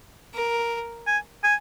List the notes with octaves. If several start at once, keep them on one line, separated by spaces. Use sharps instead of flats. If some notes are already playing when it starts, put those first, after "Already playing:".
A#4
G#5
G#5